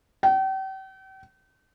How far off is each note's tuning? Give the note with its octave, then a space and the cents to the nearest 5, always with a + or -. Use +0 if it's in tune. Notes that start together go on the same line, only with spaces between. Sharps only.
G5 -40